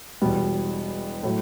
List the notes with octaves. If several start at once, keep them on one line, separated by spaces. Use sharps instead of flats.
E1 E2 B2 G3 B3
A2 F#3